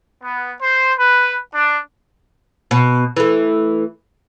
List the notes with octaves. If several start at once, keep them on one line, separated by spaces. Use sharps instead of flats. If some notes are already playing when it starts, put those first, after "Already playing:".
B3
C5
B4
D4
B2
E3 A3